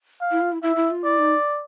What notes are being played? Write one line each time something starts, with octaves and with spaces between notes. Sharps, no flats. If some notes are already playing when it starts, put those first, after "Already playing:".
F5
E4
F4
E4
E4 E5
E4
F4
E4 D5
D#4